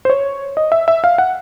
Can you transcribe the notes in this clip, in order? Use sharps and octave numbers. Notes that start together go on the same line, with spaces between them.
C5
C#5
D#5
E5
E5
F5
F#5